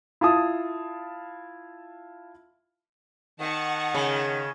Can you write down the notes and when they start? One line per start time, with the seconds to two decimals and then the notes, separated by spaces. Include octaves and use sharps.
0.21 E4 F4 A5 D#6
3.40 D#3 F#5 A5 C#6
3.95 C#3